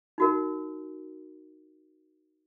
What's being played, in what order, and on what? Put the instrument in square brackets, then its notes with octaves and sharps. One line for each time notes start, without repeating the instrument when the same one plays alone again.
[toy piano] D#4 F#4 A#4